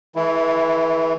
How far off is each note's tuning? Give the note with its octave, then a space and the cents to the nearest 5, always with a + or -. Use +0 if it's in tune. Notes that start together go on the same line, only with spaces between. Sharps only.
E3 -20 G#3 +35 E4 +5